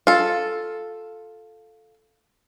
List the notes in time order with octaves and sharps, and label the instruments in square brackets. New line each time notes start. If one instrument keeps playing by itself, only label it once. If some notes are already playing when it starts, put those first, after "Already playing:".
[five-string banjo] F4 A4